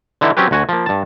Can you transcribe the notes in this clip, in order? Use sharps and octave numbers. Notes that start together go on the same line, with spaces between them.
D3 E3 D#4 E4
F#3 C4 C#4 G4 B4
D2 F#4 G#5
F3 A#3
G2 A5